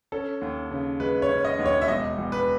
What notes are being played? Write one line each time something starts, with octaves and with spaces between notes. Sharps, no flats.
C#4 A4
D#2
C#3
G#3 B4
C#5
C#4
D#5
D#2
C#5
E5
E1 D#5
E1
B4